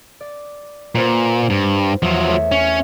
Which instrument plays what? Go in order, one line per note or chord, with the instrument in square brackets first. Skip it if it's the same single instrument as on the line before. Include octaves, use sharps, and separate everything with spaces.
[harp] D5
[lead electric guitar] A#2 [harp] B4 C5 F#5
[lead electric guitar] G2
[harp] E2 [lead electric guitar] F3 F#3
[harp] A3 C#5 E5
[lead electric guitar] C#4